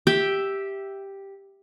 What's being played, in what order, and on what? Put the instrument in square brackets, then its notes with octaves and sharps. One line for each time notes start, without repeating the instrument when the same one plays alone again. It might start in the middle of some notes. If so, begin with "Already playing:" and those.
[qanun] G4 E5 G5